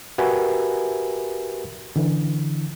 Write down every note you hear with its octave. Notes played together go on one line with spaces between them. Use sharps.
F#4 G4 A#4 B4 E5 G#5
D3 E3